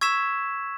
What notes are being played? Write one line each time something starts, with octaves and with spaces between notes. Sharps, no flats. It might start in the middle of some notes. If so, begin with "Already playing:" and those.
C#6 E6 G#6 B6 E7